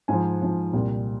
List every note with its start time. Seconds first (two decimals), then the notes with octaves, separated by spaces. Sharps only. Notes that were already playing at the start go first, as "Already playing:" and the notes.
0.08 G#2 F3 G#5
0.42 G#2 F3
0.73 C2 A#2 G3